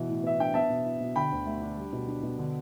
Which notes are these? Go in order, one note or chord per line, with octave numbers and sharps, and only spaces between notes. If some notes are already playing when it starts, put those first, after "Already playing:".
Already playing: B2 E3
A2
B3 E5
D4 G5
B3 E5 A5
B2
E4
B2
D3 G5 B5
D2
A3
D4
G3
B2
D4
B2
D3